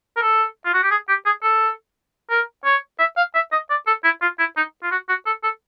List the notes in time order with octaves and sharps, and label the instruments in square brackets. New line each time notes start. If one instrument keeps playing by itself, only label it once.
[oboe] A#4
A4
F4
F#4
G4
G#4
G4
G#4
A4
A#4
C#5
E5
F5
E5
D#5
D5
A4
E4
F4
E4
D#4
F4
F#4
F#4
A4
A4